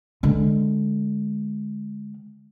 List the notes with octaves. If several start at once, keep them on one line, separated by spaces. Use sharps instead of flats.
D3 G#3